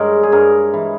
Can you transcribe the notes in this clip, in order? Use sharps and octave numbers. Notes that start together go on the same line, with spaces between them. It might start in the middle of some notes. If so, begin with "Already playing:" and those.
Already playing: G2 G#3 A#4 C#5
G#4
G2 A#4
E3